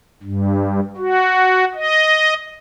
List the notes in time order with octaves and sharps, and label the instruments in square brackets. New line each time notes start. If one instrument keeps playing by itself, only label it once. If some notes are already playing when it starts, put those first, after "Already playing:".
[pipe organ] G2
F#4
D#5